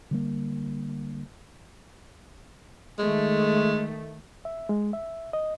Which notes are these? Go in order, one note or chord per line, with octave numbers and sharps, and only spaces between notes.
D3 G3 A#3
D#3 G#3 A3
E5
G#3
E5
D#5